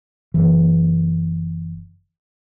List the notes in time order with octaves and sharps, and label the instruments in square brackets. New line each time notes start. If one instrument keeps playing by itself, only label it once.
[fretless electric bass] F#1 E3